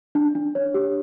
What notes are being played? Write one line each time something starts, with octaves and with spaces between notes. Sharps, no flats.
D4
D4
C#5
G4